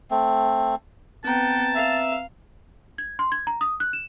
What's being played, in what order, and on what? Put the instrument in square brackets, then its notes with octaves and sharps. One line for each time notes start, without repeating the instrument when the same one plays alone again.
[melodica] A3 C4
[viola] B3 G5 [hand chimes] C4 B4 A#5 [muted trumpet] A5
[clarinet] E5 [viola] F5
[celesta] G#6
C6
G#6
A#5
D#6
F#6
E7